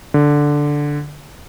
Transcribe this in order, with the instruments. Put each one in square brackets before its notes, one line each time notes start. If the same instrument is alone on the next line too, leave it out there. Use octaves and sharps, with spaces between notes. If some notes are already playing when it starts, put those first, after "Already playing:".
[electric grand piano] D3